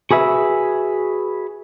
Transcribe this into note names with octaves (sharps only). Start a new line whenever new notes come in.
F#4 G#4 B4 E5